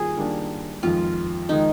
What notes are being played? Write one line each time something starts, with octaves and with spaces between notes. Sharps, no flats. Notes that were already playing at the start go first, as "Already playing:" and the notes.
Already playing: D#3 G3 A#3 F4 G#4
D#3 G3 A#3 D4
F2 D#3 G#3 F4
D#3 G#3 D#4